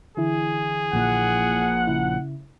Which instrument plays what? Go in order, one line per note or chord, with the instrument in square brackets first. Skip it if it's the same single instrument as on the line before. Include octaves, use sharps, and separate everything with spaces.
[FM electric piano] D3 E3 E4 [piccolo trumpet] G#4
[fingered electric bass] A#1 A#2 [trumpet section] F#5
[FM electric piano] C#3 E4